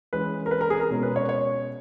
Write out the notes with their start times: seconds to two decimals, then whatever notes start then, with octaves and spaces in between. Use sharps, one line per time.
0.13 E3 G#3 C#4 B4
0.46 A#4
0.51 B4
0.61 A#4
0.70 G#4
0.80 A#4
0.90 B2 G#3 C#4
1.03 B4
1.16 C#5
1.29 C#5